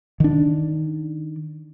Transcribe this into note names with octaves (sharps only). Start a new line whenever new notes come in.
D#3 D4